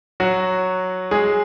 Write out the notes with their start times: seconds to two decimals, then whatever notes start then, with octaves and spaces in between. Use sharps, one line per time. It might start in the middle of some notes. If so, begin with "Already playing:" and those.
0.20 F#3 F#4
1.11 G#3 G#4